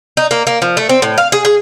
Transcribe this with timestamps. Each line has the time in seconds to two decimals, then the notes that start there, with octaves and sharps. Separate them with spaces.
0.17 D#4
0.31 A#3
0.47 A#3
0.62 F3
0.77 A3
0.89 C4
1.02 A2
1.18 F5
1.32 G#4
1.45 G#4